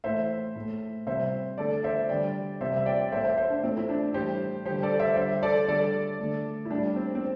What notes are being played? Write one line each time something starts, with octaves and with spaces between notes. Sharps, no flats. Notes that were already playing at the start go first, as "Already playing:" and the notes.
A2 E3 A3 C5 E5
A2 A3
C3 G3 C5 E5
D3 A3 A4 D5
C5 E5
D3 G3 D5 G5
C3 G3 C5 E5
E5
D5 G5
A2 A3 C5 E5
C5 E5
C5 E5
D4
A2 A3 C4
E4
D4
A2 E3 G3 G4 C5
D3 G3 G4 C5
A4 D5
C5 E5
D3 G3 C5 E5
A4 D5
D3 G3 A4 D5
D3 A3
E4
A2 G3 D4
C4
C4